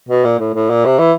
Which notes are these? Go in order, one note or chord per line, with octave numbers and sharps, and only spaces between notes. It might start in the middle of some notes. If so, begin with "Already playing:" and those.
B2
A#2
A2
A2
A#2
C3
E3